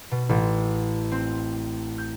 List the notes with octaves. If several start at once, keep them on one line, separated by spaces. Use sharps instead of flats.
B2
A1
C4
G6